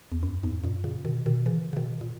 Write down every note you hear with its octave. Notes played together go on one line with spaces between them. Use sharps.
E2
F#2
E2 G#2
F#2 A#2
A#2 C#3
B2 D#3
B2 D#3
C#3 E3
C#3
B2 D#3
A#2